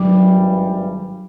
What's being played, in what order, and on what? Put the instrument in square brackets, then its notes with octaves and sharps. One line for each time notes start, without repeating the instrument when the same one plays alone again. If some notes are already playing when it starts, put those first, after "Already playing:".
Already playing: [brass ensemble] G#1 G2 E3 G3 [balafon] F#3